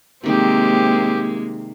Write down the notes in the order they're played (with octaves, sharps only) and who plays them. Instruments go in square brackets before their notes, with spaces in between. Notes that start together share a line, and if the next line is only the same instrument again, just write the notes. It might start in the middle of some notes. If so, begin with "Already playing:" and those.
[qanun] C3 D#3 G3 [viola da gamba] G#3 A#3 [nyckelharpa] C4 G4